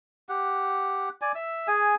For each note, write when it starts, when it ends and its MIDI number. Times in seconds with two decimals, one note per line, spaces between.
0.29 1.09 67
0.29 1.09 78
1.22 1.32 74
1.22 1.32 80
1.35 1.68 76
1.35 1.68 88
1.68 1.95 68
1.68 1.95 80